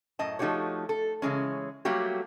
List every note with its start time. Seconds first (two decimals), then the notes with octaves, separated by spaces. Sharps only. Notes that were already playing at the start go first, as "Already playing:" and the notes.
0.19 F#2 A2 D#5 A5
0.39 F3 A3 D#4 F#4 G4 C#5
0.89 A4
1.22 C#3 E3 G#3 C#4
1.85 F#3 G3 A3 A#3 F#4 G4